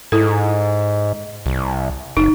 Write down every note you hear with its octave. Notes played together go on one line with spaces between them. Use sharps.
G#2 E4 A4
C2
F#1 D#4